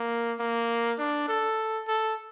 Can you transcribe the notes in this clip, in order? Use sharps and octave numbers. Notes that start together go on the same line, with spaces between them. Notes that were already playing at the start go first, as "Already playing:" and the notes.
Already playing: A#3
A#3
D4
A4
A4